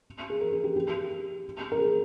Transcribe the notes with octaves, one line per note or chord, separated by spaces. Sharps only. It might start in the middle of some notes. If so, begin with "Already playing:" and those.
G#4
A#4
G#4
G4
G4
A#4
G#4